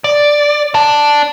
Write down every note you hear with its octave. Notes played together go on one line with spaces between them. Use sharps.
D5
D5 A5